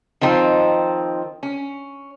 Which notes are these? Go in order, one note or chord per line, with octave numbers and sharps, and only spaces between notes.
D#3 F3 C4 D#4
C#4